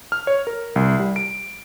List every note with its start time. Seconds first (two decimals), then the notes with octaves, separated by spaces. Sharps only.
0.12 F6
0.27 C#5
0.47 A#4
0.76 C2
1.00 G3
1.16 D7